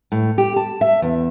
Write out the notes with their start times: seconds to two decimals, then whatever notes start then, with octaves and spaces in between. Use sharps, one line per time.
0.12 A2
0.38 G4
0.56 A5
0.81 E5
1.02 E2